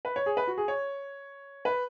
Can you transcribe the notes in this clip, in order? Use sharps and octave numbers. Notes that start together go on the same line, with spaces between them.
B4
C#5
G#4
B4
F#4
G#4
C#5
B4